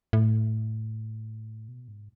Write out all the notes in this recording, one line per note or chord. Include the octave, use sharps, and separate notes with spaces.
A2
B2
G#2